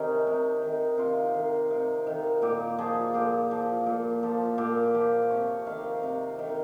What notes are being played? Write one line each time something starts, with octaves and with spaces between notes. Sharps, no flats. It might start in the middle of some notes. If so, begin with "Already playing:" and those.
Already playing: C3 D#3 C#4 D#4
C3
D#3
C3 F4
D#3
C3
D#3
A#2 G4
F3 G#4
A#2 G4
F3
A#2
F3
A#2 G4
F3 G4
C3 C#5
D#3 F5
C3
D#3